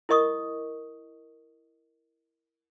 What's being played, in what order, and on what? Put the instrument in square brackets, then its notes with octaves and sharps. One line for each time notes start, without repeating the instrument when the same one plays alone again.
[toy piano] E4 A#4 D#5 C#6 D#6